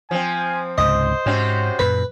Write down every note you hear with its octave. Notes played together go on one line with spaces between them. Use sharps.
F3 C4 G#5
C#2 G#2 C3 C5 D#5
G#2 C3 C#4 F#4
F#2 A#2 B4